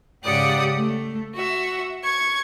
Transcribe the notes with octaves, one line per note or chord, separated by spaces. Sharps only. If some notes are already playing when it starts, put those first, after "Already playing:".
G#2 C#3 G4 D5 F#5 D#6
A3
F#4 E5
C#6 G#6